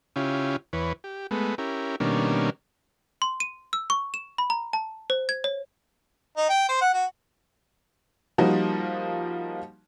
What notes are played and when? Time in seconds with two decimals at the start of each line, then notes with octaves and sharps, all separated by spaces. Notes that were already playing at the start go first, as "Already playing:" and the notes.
0.16 C#3 C#4 E4 F4 G4
0.73 E2 E3 B4 C#5
1.04 G4
1.31 G#3 A3 B3
1.58 C#4 E4 G4 A#4
2.00 B2 D#3 G3 A#3 C#4 D4
3.22 C6
3.40 D#7
3.73 E6
3.90 C#6
4.14 E7
4.38 B5
4.50 A#5
4.73 A5
5.10 C5
5.29 G#6
5.44 C#5
6.37 D#4
6.50 G5
6.69 C5
6.81 F#5
6.94 F#4
8.38 F3 G3 A#3 D#4 F#4